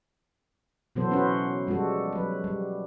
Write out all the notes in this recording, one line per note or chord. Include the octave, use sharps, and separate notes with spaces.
B2 E3 F#3 B3 A4 C5
C#4 F#4 B4 C5
F3 G3 G#3 F#4 A4
F#3 B4
G3